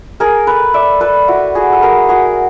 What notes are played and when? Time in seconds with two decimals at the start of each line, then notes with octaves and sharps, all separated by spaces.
0.20 G#4 A#4
0.47 A4 B4
0.74 D5 E5
1.01 A4 B4
1.28 E4 F#4
1.55 F#4 G#4
1.73 A4
1.82 G#4 A#4
2.09 F#4 G#4